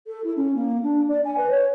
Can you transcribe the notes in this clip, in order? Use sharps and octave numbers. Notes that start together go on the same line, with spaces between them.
A4
E4
C#4
A#3
D4
D5
G#5
B4
C#5